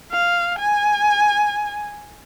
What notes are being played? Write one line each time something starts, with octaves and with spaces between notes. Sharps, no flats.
F5
G#5